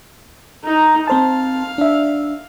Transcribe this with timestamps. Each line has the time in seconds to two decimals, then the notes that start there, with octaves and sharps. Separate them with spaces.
0.64 D#4 A#5
1.07 C4 C5 F5 A5
1.78 D4 E5